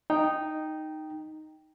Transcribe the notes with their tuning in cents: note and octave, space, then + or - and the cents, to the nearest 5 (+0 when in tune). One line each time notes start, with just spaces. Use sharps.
D#4 -5 G5 +0